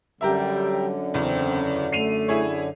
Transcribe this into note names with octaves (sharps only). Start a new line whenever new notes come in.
F#2 D3 G3 G4 A#4 E5
E2 C#3 C4
A3 C7 D#7 F7
E4 G#4 C#5